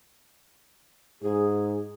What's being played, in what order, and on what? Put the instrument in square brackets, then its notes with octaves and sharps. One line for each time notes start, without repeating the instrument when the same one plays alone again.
[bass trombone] G#2 [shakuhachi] G#4